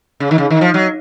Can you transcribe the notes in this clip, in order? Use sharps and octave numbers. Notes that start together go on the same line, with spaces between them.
C#3
D#3
C#3
D#3
F3
F#3